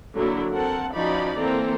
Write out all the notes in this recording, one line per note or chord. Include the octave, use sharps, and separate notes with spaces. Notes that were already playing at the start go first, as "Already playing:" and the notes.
D3 F#3 A#3 E4
C4 A4 A#4 F#5 A5
F3 C#4 D#4 F#4 D5 B5
E3 A#3 C4 A4 A#5